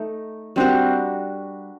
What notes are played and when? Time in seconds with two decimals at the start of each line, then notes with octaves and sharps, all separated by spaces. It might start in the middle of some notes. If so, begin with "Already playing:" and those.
Already playing: A3 D#4
0.56 G3 C4 D4 F#4 A#4